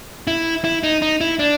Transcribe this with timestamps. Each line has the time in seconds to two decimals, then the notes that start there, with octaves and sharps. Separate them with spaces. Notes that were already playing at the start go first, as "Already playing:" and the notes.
0.27 E4
0.64 E4
0.83 D#4
1.02 D#4
1.21 E4
1.39 D4